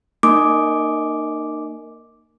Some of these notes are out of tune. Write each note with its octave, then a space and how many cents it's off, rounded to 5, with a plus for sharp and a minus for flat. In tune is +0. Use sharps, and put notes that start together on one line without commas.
A#3 -10 D#4 -30 D6 -5